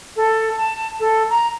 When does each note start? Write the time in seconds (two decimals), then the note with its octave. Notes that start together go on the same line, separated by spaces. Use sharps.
0.16 A4
0.58 A5
1.00 A4
1.30 A#5